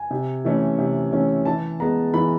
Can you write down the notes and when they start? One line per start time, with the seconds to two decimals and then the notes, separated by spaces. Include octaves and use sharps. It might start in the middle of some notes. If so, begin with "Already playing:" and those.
Already playing: G#5
0.11 C3
0.45 E3 A3 C#4
0.78 C3
1.13 E3 A3 C#4
1.45 E3 A5
1.80 G#3 B3 A#5
2.14 E3 B5